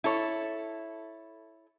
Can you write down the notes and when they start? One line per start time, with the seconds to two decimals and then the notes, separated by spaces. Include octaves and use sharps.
0.04 E4 A4 C#5